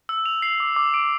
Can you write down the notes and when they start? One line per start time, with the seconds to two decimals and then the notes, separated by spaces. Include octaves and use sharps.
0.09 E6
0.26 F7
0.42 C7
0.60 D6
0.76 D6
0.94 D7